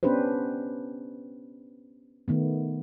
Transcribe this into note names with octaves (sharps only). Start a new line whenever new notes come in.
B3 C#4 D4 G4 B4 C5
D#3 A3 B3